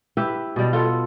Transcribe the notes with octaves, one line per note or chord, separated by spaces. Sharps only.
E4 G4 B4 E5
B2 G3
F4 A4 F#5